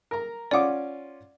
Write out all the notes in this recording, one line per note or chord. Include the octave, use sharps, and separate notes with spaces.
A#4 A#5
C#4 F4 D5 F#5 D6